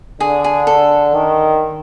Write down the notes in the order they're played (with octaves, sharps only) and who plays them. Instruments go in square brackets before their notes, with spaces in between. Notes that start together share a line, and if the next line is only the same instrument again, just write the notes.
[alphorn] D3 [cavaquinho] G#4
[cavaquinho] G#4
A4
[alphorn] D#3